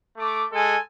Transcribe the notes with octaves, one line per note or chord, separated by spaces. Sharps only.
A3 D6
G#3 A4 G#5